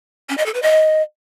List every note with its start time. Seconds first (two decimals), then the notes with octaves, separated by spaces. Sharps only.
0.29 C#4
0.38 D#5
0.46 A4
0.54 B4
0.62 D#5